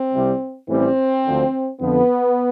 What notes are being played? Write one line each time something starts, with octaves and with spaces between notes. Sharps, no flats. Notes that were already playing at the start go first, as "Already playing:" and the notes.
Already playing: C4
C2 C3 G3
A1 A2 E3 G3 C4
D2 D3 F3
F2 D3 F3 B3